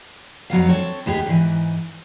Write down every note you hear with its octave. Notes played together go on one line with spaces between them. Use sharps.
F2 F#3 B3 F5
C4 A4 C#5
D#2 B3 G4 G#4
G#2 E3